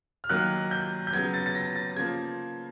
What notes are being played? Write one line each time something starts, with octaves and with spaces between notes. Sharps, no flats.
F6
D#3 F#3 A#3 F#6
G6
G6
C#3 F#3 B3 G#6
A6
A6
A#6
A6
C#3 F3 A#3 G#6